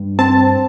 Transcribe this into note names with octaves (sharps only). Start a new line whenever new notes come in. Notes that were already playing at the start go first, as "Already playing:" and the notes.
Already playing: G2
C4 A5